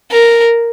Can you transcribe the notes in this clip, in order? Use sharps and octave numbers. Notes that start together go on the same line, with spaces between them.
A#4